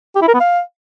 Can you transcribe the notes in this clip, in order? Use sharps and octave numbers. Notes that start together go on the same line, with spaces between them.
G4
E4
A#4
B3
F5